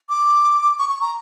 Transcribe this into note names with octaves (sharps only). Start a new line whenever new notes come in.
D6
C#6
C#6
A#5